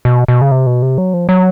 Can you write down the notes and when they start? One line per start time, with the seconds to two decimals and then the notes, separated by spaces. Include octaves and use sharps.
0.05 B2
0.28 B2
0.41 C#3
0.51 C3
0.67 B2
0.82 C3
0.98 F#3
1.14 F3
1.29 F#3